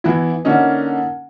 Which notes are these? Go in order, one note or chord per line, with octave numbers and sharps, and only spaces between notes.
E3 B3 E4
D3 A#3 C#4 D#4